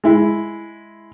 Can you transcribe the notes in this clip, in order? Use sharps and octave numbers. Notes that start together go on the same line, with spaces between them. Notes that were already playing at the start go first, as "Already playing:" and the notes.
G#3 E4